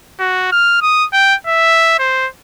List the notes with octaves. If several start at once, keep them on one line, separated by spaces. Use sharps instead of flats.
F#4
F6
D#6
G5
E5
C5